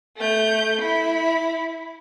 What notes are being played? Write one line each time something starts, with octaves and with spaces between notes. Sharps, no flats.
A3 G6
E4 B5